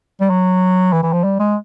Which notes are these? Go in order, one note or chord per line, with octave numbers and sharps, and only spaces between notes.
G3
F#3
E3
E3
F3
G3
G#3